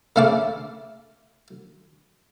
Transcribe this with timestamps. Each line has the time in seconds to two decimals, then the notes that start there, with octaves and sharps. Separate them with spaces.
0.16 C#3 A3 F5 A5 D6